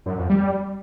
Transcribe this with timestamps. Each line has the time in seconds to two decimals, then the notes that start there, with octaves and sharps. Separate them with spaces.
0.06 F#2
0.18 F2
0.29 G3